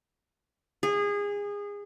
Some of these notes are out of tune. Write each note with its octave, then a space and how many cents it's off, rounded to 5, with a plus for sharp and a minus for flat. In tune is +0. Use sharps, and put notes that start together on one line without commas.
G#4 -25